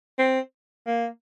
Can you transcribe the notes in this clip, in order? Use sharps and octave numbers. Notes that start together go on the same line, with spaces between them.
C4
A#3